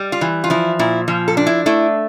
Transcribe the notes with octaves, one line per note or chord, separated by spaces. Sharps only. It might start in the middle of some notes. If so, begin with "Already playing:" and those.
Already playing: G3
F4
E3
F4
F3 E4
A#2 E4
F3
A4
D4
E4
A3 E4